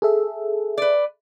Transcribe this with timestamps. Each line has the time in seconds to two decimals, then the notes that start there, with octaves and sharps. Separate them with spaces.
0.02 G#4 A4 E5
0.78 B4 D5